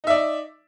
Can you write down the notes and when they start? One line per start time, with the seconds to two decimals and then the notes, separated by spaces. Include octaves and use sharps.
0.04 D#4
0.07 E5
0.10 D5